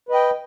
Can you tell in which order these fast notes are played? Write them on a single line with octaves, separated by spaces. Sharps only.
B4 D#5 G5